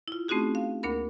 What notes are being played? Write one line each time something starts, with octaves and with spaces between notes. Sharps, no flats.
E4 F4
A3 C4 C#4 D#4 F#4 G#4
F5
D2 A#3 D4 A#4 B5